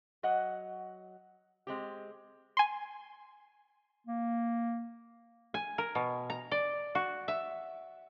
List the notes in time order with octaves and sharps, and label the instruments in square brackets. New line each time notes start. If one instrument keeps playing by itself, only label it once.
[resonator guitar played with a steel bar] F#3 D#5 F#5
G#3 C4 G4
[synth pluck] G#5 C6
[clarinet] A#3
[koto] G#5
A#4
B2
A#5
D5
F#4
E5